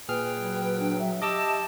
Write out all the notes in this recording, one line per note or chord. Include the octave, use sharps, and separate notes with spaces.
A#2 G#4 B4 G5 F6
F#3
D4
E5
G4 D#5 A5 D6 E6